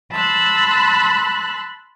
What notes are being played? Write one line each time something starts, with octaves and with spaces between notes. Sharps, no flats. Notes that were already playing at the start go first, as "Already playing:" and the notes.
A5 B5 C6 E6 F#6